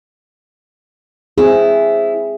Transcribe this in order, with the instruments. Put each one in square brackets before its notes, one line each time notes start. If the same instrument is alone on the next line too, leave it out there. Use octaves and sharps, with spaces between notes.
[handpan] C4 G#4 [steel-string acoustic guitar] E4